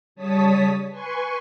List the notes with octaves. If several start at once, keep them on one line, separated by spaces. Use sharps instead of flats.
C#3 G3 C#5 A5 D#6 B6
B4 G#5 C6 C#6